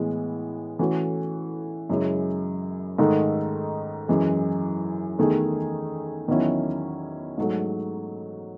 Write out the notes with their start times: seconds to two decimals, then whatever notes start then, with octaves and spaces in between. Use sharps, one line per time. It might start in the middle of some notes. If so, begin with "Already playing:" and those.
Already playing: A2 E3 G#3 B3
0.79 E3 A3 C#4 F#4 A4
1.90 F#2 C#3 G#3 C#4 E4
2.98 G#2 D#3 A3 D#4 A4
4.08 F#2 E3 G#3
5.19 E2 D#3 A3 D#4 G#4
6.28 E2 D#3 F#3 C#4 E4
7.38 G#2 F#3 A3